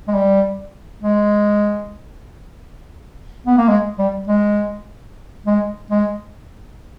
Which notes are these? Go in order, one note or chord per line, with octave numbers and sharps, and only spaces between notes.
G#3
G3
G#3
B3
A#3
G#3
G3
G#3
G#3
G#3